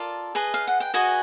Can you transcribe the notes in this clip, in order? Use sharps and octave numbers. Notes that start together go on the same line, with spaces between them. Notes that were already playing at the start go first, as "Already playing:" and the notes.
Already playing: F4 A4 A#4 D5 A5
G#4 B4 D#5
F5
F#5
G5
F#4 G#4 B4 D#5 G#5